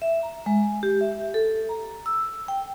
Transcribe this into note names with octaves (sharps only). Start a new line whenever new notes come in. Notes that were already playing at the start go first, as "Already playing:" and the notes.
E5
A#5
G#3
G4
E5
A4
A#5
E6
G5